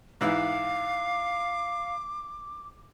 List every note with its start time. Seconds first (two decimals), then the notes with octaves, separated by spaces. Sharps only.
0.21 G#2 E3 E4 F5 D6